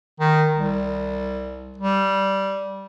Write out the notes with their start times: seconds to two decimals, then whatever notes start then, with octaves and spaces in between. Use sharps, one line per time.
0.20 D#3
0.56 C2
1.78 G3